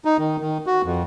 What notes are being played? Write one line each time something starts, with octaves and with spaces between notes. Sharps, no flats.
D#4
D#3
D#3
F#4
F2